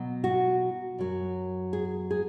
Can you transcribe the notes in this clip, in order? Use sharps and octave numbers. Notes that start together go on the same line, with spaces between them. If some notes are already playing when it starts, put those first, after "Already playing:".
Already playing: B2 F#3
F#4
F#2 F#3
G#4
G#4